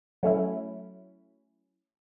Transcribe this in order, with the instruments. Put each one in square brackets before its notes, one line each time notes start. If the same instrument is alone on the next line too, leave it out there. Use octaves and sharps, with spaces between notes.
[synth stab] F#3 A3 C#4 E4